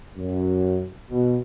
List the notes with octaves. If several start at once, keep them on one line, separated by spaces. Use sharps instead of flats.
F#2
B2